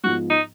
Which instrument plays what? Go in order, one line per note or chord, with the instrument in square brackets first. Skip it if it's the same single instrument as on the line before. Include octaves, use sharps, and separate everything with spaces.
[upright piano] G#2 F3 B3 [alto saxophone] F#4
[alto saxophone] D#4